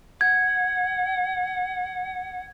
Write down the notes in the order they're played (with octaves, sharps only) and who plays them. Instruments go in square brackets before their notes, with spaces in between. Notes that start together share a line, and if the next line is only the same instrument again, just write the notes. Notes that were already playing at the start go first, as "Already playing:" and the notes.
[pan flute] F#5 [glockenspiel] G#6